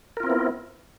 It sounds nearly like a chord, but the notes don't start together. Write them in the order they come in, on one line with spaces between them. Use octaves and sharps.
A#4 F4 C4 E4 B3